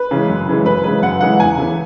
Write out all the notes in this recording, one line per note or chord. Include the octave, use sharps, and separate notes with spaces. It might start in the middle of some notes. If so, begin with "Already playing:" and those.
Already playing: B4
C#3 E3 G#3
F#2
C#3 E3 G#3
F#2 B4
C#3 E3 G#3 B4
F#2 F#5
C#3 E3 G#3 F#5
E2 G#5
C#3 E3 B3